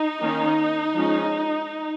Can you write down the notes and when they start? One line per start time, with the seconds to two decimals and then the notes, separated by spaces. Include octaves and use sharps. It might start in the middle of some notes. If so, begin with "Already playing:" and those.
Already playing: D#4
0.21 D#3 A#3 C#4
0.94 F3 G#3 C#4